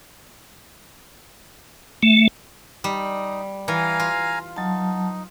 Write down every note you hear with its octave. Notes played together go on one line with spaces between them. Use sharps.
A3
G3 D#4
E3 F5 G#5 A#5
F4
F#3 D#4 A5